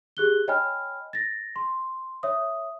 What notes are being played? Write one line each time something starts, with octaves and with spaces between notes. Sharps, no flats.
G4 G#4 F#6 G7
C#5 D#5 G5 G#5 B5 F6
A6 A#6
C6
C#5 E5 D#6